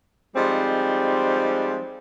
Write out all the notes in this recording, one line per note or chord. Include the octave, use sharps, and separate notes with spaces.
F3 G3 G#3 C4 D#4